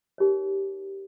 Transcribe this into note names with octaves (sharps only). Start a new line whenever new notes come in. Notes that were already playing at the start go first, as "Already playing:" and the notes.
D#4 G4 A#4 C#5